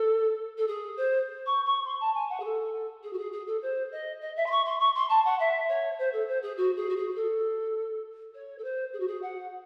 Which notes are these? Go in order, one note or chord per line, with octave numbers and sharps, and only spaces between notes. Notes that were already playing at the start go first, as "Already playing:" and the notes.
Already playing: A4
A4
G#4
C5
C#6
C#6
C6
A5
G#5
F#5
G#4
A4
G#4
F#4
G#4
G#4
A4
C5
D#5
D#5
E5
C6
C#6
C6
C#6
C6
A5
F#5
E5
C#5
C5
A4
C5
G#4
F#4
G#4
F#4
G#4
A4
C#5
A4
C5
G#4
F#4
G#4
F#5